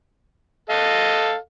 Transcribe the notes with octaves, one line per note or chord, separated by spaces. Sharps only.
A4 D#5 F5